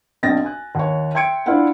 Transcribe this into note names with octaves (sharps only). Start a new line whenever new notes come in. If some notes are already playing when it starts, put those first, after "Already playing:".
B1 C4 D4 A6 A#6
G#5 F#6
D#2 C#5
E5 G5 C6 G#6 C#7 D7
D4 E4 F4 F5 F#5